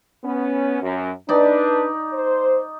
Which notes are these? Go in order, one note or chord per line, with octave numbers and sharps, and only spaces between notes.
B3 C#4
F#2
D4 D#4 B4 D5
C5